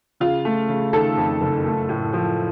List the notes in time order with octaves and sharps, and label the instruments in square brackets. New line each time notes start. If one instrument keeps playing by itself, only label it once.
[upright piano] C#3 [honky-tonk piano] F4
[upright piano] A3
C#3
[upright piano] D#3 [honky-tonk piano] A4
[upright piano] F2
F#1
A3
A2
F3